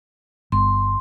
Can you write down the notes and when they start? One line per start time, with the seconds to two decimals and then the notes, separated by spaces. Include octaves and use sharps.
0.52 G1 C6